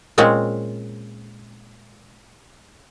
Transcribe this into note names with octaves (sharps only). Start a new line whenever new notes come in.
A#2 G#3 C4 C#4